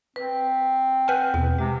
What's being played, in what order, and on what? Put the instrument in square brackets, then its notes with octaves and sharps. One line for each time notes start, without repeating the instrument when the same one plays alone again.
[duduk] C4 [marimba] B4
[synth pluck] B4 F#5 G#5 [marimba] F6 G6
[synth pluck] E2 [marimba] B2
[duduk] C3 [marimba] G#3